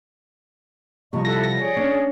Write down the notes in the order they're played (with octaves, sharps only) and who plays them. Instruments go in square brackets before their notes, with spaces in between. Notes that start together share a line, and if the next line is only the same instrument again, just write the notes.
[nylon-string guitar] C3 F3 G3 [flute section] D#5 C#6
[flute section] E4 A4 F#5 [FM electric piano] A#6
[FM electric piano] A#6
[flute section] G#4 C#5 D5
[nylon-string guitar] C#4 D4